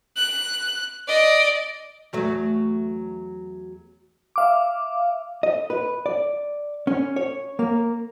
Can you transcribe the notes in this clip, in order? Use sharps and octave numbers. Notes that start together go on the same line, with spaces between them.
F#6
D5 D#5
E2 F#3 A3
E5 F5 D6
D#5
B4
D5
C#4
C#5
A#3